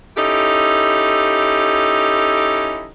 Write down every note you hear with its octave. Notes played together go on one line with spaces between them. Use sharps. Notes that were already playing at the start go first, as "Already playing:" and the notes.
C#4 D#4 E4 G4 A4